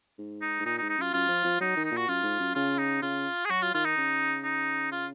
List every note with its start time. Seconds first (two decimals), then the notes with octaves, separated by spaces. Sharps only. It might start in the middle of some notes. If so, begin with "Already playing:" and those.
0.19 G#2
0.42 D#4
0.60 G#2
0.66 A#2 D#4
0.78 D#4
0.82 G#2
0.89 D#4
0.97 F#2 F4
1.13 F#2 F4
1.29 F3
1.45 F3
1.60 F#3 D#4
1.77 D#3
1.85 D#4
1.92 A#2 F#4
2.08 F#2 F4
2.24 G#2
2.40 F#2
2.55 C#3 F4
2.79 D#4
3.02 C#3 F4
3.45 G#4
3.50 F#3 F#4
3.62 F4
3.74 D#3 F4
3.85 D#4
3.98 C#3
4.44 D#4
4.92 F4